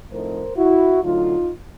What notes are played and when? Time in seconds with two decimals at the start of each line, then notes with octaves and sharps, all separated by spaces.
0.11 A2 F3 A3 C4 D#4 A#4 C5
0.56 E4 F#4
1.02 D3 F#3 A3 D#4 F4